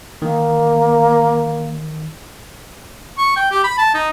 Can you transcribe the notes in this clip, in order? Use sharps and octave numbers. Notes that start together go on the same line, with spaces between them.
D#3 A#3
C#6
G5
G4
B5
A5
D#4